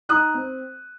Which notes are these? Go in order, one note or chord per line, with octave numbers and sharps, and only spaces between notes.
D#4 D#6 F#6
C4